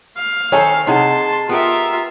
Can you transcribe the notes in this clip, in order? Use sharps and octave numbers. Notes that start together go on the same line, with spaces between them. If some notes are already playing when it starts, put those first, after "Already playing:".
F5
D#3 A4 C5 C#5 E5 G#5
C3 D#4 G#4 F#5 A5 C6
B3 F4 G4 A#4 E5